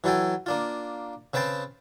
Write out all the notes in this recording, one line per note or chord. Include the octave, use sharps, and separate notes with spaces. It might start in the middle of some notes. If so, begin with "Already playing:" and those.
E3 F#3 A4 G5 G#5
A#3 D4 F4
C#3 C4 B4 G5 A5 C6